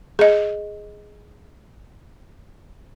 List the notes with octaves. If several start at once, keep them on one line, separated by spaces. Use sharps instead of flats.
G#4 D#5